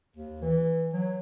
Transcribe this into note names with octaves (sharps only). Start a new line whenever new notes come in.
D#2
E3
F#3